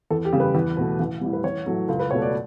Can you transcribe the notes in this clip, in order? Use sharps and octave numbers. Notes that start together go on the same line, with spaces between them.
E2 A4
G4
C#3 G3
B4
E2
B2 A3
A1
A2 G3
B4
A1 C#5
A2 F#3 A3
C#2 A4
B4
B2 A3 C#5
D5